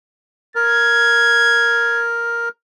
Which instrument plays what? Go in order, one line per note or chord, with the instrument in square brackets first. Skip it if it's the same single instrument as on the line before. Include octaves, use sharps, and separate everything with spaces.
[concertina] A#4 [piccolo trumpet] G#6